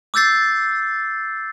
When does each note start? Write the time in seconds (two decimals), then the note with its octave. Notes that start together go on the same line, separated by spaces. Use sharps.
0.14 D6 E6 G6 A6 C7